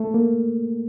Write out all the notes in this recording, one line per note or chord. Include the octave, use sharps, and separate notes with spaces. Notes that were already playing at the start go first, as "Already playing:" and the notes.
Already playing: A3
A#3